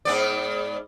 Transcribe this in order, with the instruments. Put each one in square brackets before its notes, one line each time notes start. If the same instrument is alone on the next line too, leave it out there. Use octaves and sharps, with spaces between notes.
[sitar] G#2 B3 D5